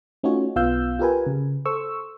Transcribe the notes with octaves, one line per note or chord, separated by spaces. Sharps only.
A3 C#4 D#4 F4 F#4 C#5
B1 B3 F4 F5 E6 G6
F4 G4 A#4 B4 G#5
C#3
A4 C5 C#6 E6